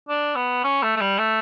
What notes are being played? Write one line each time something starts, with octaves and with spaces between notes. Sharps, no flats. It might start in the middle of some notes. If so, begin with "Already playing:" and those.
D4
B3
C#4
A3
A3
G3
A3